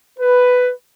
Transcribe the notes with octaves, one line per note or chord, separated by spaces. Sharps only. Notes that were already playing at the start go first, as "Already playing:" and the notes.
B4